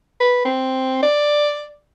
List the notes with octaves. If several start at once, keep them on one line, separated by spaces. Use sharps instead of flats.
B4
C4
D5